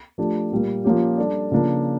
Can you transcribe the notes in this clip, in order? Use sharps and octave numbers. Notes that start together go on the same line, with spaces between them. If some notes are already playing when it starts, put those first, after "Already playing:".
F3 A3 D4 G4
A#2 G3 A#3
F3 A#3 C#4 G4
G3 D4 A4 D5
C#3 F3 A#3 D4 F4